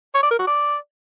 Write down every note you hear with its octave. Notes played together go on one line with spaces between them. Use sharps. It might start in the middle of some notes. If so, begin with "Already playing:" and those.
C#5
D5
A#4
F#4
D5